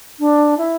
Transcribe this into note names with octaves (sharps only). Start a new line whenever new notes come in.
D4
E4